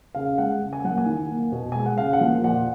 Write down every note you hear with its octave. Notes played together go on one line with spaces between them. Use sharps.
C#3 F5
G#3 F#5
C#3
G#5
F#3 A#3 F#5
G#5
D#3
A#3
B2
G#3 G#5
F#5
C#3 F5
F#5
F3 A#3
A#2 F#5